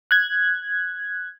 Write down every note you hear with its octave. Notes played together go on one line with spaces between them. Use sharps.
F#6 G#6